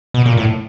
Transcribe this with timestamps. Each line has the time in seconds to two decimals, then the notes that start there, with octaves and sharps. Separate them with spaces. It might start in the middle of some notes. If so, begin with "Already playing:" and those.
0.14 B2
0.25 A#2
0.37 A2